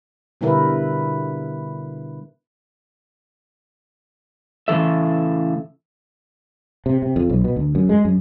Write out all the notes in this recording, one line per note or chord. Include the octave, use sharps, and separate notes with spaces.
B2 D3 G3 E4 A#4 B4
A2 C#3 E3 A4 E5
C3
C3
F2
B1
B2
D2
F#2
G#3
F#2